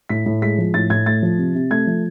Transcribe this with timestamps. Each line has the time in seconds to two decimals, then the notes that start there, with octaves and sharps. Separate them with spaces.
0.09 A2 B6
0.26 A2
0.42 G#3 B6
0.58 F3
0.74 A2 A6
0.90 A2 G#6
1.06 A3 A6
1.22 F3
1.38 C3
1.55 C3
1.71 A3 G#6
1.87 F3